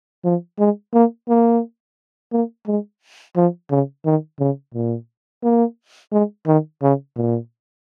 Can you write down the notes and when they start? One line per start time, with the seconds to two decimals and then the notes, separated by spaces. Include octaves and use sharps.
0.24 F3
0.59 G#3
0.93 A#3
1.28 A#3
2.32 A#3
2.67 G#3
3.36 F3
3.70 C#3
4.05 D#3
4.39 C#3
4.74 A#2
5.43 A#3
6.12 G#3
6.46 D#3
6.82 C#3
7.16 A#2